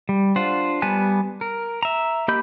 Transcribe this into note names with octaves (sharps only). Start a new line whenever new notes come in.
G3
D4 F4 C5 F#5
G3 B3 G#5 A5 F#6
A#4
E5 A#5
A#3 G4 D#5 B5 G6